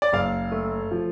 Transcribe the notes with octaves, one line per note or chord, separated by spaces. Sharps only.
D5
F#1 F5
A3
F3